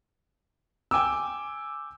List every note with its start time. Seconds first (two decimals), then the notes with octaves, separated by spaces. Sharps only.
0.91 G5 G#5 D6 E6